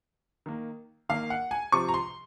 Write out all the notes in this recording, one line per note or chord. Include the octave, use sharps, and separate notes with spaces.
D#3 A#3
D#3 A#3 F5
F#5
G#5
C3 F3 C4 C#6
A#5
C6